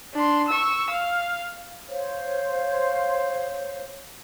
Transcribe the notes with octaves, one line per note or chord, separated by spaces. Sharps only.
D4 C6
C#6 E6
F5
C5 C#5 F5